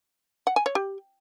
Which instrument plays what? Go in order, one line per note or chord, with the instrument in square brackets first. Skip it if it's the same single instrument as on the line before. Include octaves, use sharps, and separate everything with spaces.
[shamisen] F#5
G#5
C#5
G4